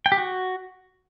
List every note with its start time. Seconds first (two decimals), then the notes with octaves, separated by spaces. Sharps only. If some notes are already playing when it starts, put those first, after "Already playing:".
0.06 G5
0.12 G4
0.18 F#4